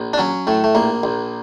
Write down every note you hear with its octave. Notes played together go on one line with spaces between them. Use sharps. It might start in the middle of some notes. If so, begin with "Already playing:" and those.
Already playing: A#1
D4
F#3 C#4
A2 A3
A3
A#1 A#3
A#1